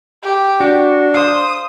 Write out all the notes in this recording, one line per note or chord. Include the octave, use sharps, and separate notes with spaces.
G4
D4 F#4
C5 F5 D#6